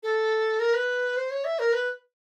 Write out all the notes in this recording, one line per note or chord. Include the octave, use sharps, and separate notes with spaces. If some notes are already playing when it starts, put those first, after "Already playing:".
A4
A#4
B4
C5
C#5
E5
A#4
B4